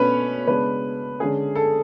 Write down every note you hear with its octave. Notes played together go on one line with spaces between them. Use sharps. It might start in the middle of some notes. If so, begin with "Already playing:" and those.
Already playing: B2 A3 B3 C#4 D4 B4 C#5
C#3 G#3 B3 D4 B4
D3 G#3 C#4 G#4
A4